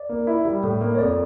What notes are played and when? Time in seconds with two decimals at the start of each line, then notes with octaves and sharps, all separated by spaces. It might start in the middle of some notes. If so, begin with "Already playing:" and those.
Already playing: D5
0.09 A#3
0.27 E4
0.45 G3
0.63 A2
0.81 A#3
0.95 C#5
0.99 F2 D5